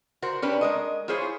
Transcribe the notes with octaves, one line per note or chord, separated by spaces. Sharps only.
F#4 A#4 C5
C#4 D4 G4 B4
G#3 A#4 D#5
E4 F4 G#4 C5 C#5